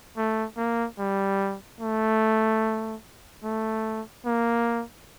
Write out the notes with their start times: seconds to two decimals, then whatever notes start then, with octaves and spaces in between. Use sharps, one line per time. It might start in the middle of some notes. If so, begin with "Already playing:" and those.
0.17 A3
0.57 A#3
0.99 G3
1.81 A3
3.44 A3
4.26 A#3